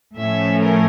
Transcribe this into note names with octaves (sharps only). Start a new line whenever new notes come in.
A2 F3 A3 C#4 E5
A#4